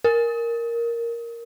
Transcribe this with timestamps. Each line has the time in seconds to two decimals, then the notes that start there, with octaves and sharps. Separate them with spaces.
0.04 A#4